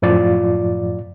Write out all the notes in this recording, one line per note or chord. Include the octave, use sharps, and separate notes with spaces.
F#2 A2 F3 F4 D5 A6